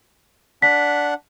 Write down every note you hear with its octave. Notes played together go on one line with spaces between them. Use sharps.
D4 F#5 B6